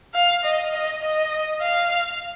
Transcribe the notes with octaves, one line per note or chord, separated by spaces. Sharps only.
F5
D#5
D#5
D#5
F5